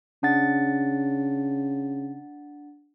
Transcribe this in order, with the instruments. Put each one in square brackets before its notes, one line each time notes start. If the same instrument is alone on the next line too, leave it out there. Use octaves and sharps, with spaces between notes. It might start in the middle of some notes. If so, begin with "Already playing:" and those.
[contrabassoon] C#3 [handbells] D4 F#5 A6